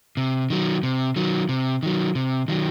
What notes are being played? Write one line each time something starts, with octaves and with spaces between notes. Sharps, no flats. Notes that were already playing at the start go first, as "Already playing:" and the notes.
C3
D#3 F#3
C3
D#3 F#3
C3
D#3 F#3
C3
D#3 F#3